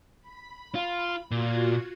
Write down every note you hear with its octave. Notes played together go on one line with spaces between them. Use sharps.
B5
F4
A#2 F4 F#4 G#6